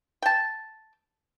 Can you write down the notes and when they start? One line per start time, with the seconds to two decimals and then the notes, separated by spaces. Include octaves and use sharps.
0.22 G5 A5